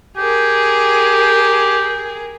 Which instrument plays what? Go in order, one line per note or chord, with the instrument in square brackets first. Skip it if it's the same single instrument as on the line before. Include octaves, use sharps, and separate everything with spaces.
[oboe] G4 [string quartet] G#4 A#4